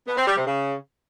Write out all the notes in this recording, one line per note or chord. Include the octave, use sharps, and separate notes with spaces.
B3
C4
G3
C3
C#3